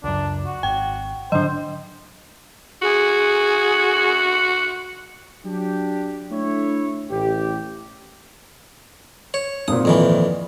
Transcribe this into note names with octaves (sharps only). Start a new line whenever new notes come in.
C#2 F#2 D4
F#4
G#1 G5
G#2 D3 F#3 D4 C5 D#5
F#4 G#4
F#3 D4 G4
A3 D4 E4 C#5
A1 G4
C#5
G#1 A#2 D#6
F2 D#3 E3